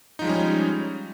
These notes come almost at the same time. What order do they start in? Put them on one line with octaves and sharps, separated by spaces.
D#4 F3 G#3 G3 C#4